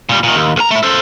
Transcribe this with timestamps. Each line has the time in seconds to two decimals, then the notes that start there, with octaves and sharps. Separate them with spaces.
0.09 A#2 G3
0.23 A#2 D#3
0.36 D#2
0.56 B1 A#5
0.71 A3 E4
0.83 A4 C5